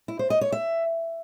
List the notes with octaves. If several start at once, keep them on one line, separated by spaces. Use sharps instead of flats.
E4
C5
D#5
C#5
E5